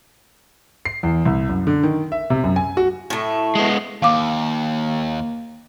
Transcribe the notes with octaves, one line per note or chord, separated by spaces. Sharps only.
C7
E2
C2
F#2
D3
D#3
E5
C3
F#2
G#5
F#4
A2 A3
G#3 B3
D#2 A#3 F5 D6